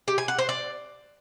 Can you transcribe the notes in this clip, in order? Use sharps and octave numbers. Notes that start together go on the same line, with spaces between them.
G4
G#5
F#5
C5
D5